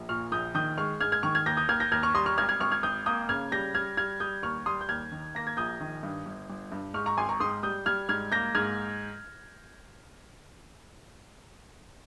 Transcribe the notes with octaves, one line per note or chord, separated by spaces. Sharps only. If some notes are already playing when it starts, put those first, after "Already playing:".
Already playing: A#1
A#2 C#6 F6
A#1 D#6 G6
D#3 D#6 G6
G#3 C#6 F6
G#2 F6 G#6
F6 G#6
D#3 C#6 F6
F6 G#6
D#2 G6 A#6
D#6 G6
D#2 F6 G#6
G6 A#6
D#2 F6 G#6
C#6 F6
G3 C6 D#6
C#6 F6
G#1 F6 G#6
F6 G#6
G#1 C#6 F6
F6 G#6
G#1 D#6 G6
A#3 D#6 G6
C#3 F6 G#6
G3 G6 A#6
G3 F6 G#6
G3 F6 G#6
G3 D#6 G6
D#2 C#6 F6
G3 C6 D#6
G6
D#2 F6 G#6
D#3
A#3 A#6
G#6
A#1 D#6 G6
D#3
G2
G1
G1
G2
G#2 C#6 F6
A#5 C#6
G#1 G#5 C6
A#5 C#6
G#2 C6 D#6
G3 D#6 G6
G3 F6 G#6
G#2 F6 G#6
A#3 G6 A#6
G#2 F6 G#6